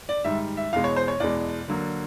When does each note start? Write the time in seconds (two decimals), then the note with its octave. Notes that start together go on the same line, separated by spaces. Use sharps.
0.09 D5
0.24 G#2 D#3 G3 E5
0.57 E5
0.72 E2 B2 G#3 F5
0.84 C#5
0.96 C5
1.08 C#5
1.20 E2 B2 G#3 D5
1.68 D3 F#3 A#3